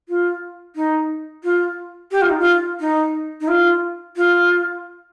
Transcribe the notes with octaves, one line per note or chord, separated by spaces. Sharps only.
F4
D#4
F4
G4
F4
D#4
F4
D#4
D#4
F4
F4